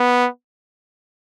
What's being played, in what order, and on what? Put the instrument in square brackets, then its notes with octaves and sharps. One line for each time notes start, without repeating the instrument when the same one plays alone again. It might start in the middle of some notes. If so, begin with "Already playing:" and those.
Already playing: [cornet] B3